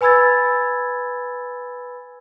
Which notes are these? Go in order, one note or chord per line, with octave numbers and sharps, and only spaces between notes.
B4 G#5 B5 E6 G#6 A6